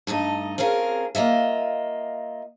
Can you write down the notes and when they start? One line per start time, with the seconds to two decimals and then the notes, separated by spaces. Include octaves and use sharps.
0.07 G2 A3 D#4 D#5
0.58 C4 C#4 F4 G#4 A#4
1.15 A#3 F4 D#5 E5